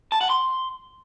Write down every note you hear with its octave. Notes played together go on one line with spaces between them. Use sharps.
A5
F#5
C6